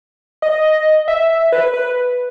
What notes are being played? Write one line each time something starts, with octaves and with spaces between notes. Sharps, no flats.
D#5
E5
E5
B4
B4